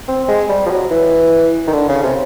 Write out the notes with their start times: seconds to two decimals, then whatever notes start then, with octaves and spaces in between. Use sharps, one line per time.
0.08 C4
0.28 G#3
0.49 G3
0.66 F3
0.71 F#3
0.91 E3
1.67 D#3
1.73 D3
1.88 C#3
2.03 C3